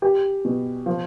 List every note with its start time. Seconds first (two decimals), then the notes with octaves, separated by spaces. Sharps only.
0.02 G4
0.45 B2
0.86 F3